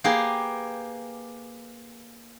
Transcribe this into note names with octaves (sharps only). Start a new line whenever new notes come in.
A#3 G4 G#4 B4